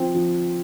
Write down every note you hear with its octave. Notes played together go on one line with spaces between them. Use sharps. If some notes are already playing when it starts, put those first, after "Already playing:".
Already playing: F3 C4
F3